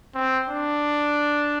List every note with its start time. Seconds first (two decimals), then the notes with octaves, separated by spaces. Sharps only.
0.15 C4
0.48 D4